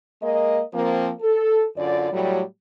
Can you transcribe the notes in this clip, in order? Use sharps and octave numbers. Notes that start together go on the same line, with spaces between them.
G#3 A#3 A#4 D#5
F3 A#3 C4
A4
F#2 D3 F4 D5
A2 F#3 G3